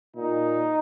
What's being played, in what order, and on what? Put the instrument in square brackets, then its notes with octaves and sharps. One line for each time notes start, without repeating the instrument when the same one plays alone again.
[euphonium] A#2 [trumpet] D#4